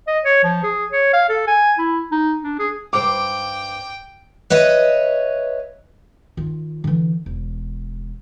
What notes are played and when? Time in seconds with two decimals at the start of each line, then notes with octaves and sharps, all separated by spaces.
0.07 D#5
0.25 C#5
0.43 F3
0.63 G#4
0.92 C#5
1.13 F5
1.29 A4
1.47 G#5
1.78 E4
2.11 D#4
2.43 D4
2.59 G#4
2.93 G2 C5 G5 D6
4.50 B4 C#5 D#5 E5
6.37 D#3 F4
6.84 D3 E3
7.26 E1